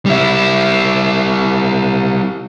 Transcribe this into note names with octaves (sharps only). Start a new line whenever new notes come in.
G3 E4